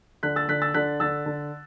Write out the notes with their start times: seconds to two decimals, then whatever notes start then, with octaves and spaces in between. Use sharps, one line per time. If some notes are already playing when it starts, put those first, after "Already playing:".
0.23 D3 F#6 B6
0.36 E6 A6
0.48 D3 F#6 B6
0.62 E6 A6
0.74 D3 F#6 B6
1.00 D3 E6 A6
1.26 D3